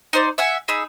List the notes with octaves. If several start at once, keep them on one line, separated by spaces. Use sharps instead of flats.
D#4 C5 D5
E5 F#5 G#5
D#4 G#4 B5 E6